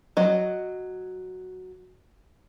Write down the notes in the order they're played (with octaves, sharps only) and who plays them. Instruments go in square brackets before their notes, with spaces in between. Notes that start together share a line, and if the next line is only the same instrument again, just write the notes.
[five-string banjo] F#3 D#5